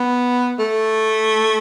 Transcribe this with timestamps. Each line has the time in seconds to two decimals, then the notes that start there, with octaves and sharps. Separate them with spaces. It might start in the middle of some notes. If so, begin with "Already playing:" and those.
Already playing: B3
0.59 A3